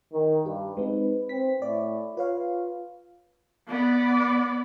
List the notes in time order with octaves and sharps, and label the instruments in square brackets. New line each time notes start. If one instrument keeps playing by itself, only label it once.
[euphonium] D#3
[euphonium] G2 [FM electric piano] G4
[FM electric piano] G#3 C4 D#4 [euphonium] B4
[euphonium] C4 [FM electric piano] B6
[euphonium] A2 [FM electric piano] D5
[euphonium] F4 [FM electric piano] B4 C#5 F5
[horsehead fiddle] B3 D5